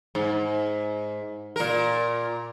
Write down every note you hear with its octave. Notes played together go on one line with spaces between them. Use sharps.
G#2
A#2 A#4